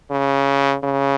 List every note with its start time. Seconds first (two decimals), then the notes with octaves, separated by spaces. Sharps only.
0.10 C#3
0.83 C#3